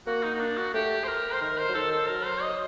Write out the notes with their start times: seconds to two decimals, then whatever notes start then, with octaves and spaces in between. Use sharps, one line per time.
0.07 A#3 F#4
0.23 D#4
0.34 D#4
0.40 D4
0.58 F#4
0.74 A3 G4
1.04 C5
1.08 A#4
1.33 C5
1.41 D#3 A#4
1.58 C5
1.69 F#3
1.74 D#3 A4
1.92 A4
2.09 F#3 A#4
2.25 C5
2.42 D#5